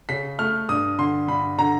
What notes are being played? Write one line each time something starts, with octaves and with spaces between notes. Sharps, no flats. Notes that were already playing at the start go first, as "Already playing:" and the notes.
C#3 B6
A3 F6
G2 D#6
D3 C6
G2 B5
D3 A#5